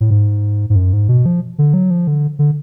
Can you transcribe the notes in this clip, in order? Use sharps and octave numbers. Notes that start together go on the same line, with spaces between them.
A2
G#2
G#2
F#2
G#2
B2
F3
D3
F#3
F3
D3
D3